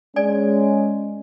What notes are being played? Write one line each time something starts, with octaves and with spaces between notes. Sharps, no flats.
G#3 C#4 D5 G#5